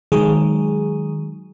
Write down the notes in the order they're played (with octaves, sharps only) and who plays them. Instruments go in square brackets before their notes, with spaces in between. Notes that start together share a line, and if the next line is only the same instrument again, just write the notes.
[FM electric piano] D#3 F#3 G#3 G#4